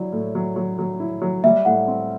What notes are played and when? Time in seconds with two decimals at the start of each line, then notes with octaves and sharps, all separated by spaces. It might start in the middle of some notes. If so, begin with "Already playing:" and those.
Already playing: F#3 E4 D5
0.12 A2
0.35 F#3
0.56 F#3
0.79 F#3
1.00 E4
1.22 F#3
1.44 G3 E5
1.65 A2 F#5
1.88 C4